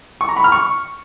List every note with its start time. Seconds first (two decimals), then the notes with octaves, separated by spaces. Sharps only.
0.21 C#6
0.29 A#5
0.36 B5
0.44 F6
0.52 C#6